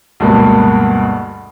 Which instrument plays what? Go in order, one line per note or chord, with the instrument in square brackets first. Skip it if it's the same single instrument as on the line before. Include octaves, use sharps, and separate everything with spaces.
[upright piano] D2 G2 B2 G#3 A#3